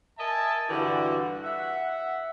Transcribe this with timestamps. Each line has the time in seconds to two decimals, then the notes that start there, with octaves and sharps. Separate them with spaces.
0.19 A#4 D#5 E5 G#5 A5
0.70 G2 D3 E3 D4 F#4
1.43 E5 F#5